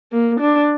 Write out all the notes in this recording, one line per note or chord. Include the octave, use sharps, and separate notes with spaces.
A#3
D4